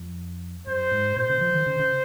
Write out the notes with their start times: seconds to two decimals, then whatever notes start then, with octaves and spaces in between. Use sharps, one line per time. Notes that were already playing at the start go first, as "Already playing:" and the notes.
Already playing: F2
0.67 F#2 C5
0.91 G#2
1.16 A#2 C5
1.29 C#3
1.41 F3
1.54 D#3
1.66 C#3
1.79 C#3